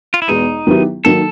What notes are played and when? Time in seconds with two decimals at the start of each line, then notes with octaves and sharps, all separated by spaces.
0.14 F4
0.22 E4
0.28 E2 B2 G#3 B3 D#4
0.67 D#3 F#3 B3 E4 G4
1.05 D#3 F#3 A#3 A4